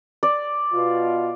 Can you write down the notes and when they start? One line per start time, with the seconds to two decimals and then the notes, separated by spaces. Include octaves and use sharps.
0.23 D5
0.74 B2 F4